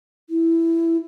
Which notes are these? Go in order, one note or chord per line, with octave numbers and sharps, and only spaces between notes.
E4